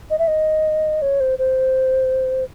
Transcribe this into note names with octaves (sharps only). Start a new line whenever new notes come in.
D#5
E5
D#5
C#5
C5
C5